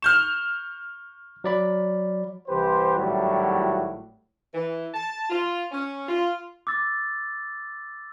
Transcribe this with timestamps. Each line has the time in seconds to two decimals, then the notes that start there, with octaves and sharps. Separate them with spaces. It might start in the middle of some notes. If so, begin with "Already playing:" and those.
0.02 C#6 F6 G6 E7
1.44 F#3 D5 B5
2.48 C2 E3 G4 B4 C5
2.98 G#1 A2 F#3 G3 E4 F#4
4.54 E3
4.94 A5
5.30 F4
5.72 C#4
6.08 F4
6.67 D6 E6 A6